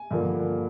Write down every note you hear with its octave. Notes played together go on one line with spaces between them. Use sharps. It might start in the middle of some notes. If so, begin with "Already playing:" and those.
Already playing: G#5
G2 D3 F3 A#3